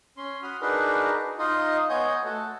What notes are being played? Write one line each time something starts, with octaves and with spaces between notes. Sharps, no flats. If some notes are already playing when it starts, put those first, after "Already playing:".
C#4 C6
F#4 B5 D#6 F6
D4 D#4 F#4 G#4 A#4 B4
D#4 F4 D#5
B3 C#5 D#5 G#5 G6
A3 F#4 A4